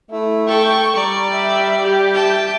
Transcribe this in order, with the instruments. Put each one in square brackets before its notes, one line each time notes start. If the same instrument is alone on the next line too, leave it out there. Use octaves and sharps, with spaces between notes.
[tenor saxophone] A3 [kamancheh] E4
[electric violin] A4 [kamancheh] G5 [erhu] C#6
[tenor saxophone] G3 [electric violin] D5 [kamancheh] A#5
[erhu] E5 [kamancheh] G5
[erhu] G4
[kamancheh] E5 [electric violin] G5 A5